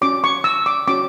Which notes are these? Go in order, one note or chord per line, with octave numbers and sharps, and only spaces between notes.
C#4 F#4 C#5 D6
C#6
E6
D6
C#4 F#4 C#5 D6